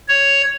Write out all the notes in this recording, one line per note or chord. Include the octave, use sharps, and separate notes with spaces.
C#5